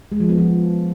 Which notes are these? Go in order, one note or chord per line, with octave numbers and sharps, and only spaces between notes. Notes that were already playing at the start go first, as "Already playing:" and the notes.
G#3
F3
B3
F3